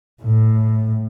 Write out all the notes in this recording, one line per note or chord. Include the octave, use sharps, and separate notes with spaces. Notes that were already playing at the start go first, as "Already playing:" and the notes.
A2